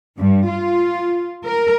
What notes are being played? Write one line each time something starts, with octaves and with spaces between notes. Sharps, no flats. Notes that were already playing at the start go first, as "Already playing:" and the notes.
G2
F4
A#4